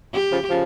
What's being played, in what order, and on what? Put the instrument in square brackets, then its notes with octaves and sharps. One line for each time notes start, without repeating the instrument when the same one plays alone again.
[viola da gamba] G4
[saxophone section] C#3 F3
C#3 F3